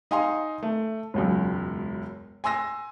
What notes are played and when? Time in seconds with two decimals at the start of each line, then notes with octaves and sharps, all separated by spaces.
0.11 D#4 F5 G#5 A#5 C6
0.63 A3
1.14 E1 C#2 F#2
2.44 G#5 C6 E6 A#6